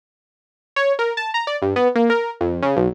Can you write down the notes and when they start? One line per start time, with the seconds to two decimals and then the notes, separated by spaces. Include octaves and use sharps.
0.76 C#5
0.99 A#4
1.17 A5
1.34 A#5
1.47 D5
1.62 G2
1.76 B3
1.95 A#3
2.10 A#4
2.41 F2
2.63 C#3
2.76 B1